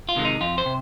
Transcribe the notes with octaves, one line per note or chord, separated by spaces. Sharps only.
F4
C3 D#3 G#3
D#4
F2 F4
C5
C3